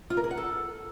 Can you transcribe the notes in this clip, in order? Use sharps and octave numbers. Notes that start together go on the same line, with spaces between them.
F4
A#4
G#4
F#5
A4